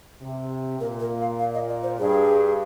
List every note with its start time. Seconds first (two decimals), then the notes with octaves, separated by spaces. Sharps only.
0.22 C3
0.80 A#2 A#4
1.00 A#4
1.20 F5
1.39 F5
1.54 D#5
1.68 D5
1.83 C5
1.99 G2 G#4